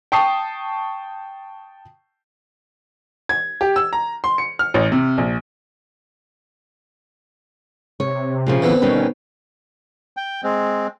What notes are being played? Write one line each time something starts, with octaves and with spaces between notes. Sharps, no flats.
G5 A5 C#6 D#6 C7
G#6
G4
E6
A#5
C6
C#7
F6
A1
C3
A#1
C3 C#5
A#2 C#3 F3
D3 E3 B3 C4
B2 D#3 G3 C#4
G5
G#3 C4